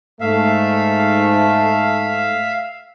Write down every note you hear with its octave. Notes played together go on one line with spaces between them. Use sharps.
G#2 A3 E5 F5